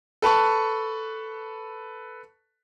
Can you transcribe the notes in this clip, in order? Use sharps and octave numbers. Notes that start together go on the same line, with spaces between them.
A4 B4 A5 C#6